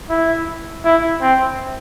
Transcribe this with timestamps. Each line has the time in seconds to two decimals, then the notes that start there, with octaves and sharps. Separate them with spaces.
0.10 E4
0.85 E4
1.21 C4